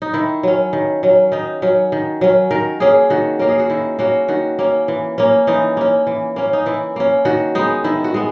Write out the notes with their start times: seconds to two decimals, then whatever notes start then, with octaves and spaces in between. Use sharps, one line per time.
0.02 D#4
0.14 D#3 E4
0.43 F#3 C#4
0.73 D#3
1.03 F#3 C#4
1.32 D#3 D#4
1.62 F#3 C#4
1.92 D#3
2.21 F#3 C#4
2.51 D#3 A#4
2.80 A#3 C#4 G#4
3.10 D#3 F#4
3.39 A#3 C#4 A#4
3.49 G#4
3.59 F#4
3.70 D#3 E4
3.99 A#3 C#4 F#4
4.28 D#3 F#4
4.59 A#3 C#4
4.88 E3
5.18 A#3 C#4
5.47 E3 D#4
5.77 A#3 C#4
6.07 E3
6.36 A#3 C#4
6.53 D#4
6.66 E3 E4
6.96 A#3 C#4
7.25 D#3 F#4
7.55 G#3 B3 D#4
7.84 D#3 E4
8.04 F#4
8.14 G#3 B3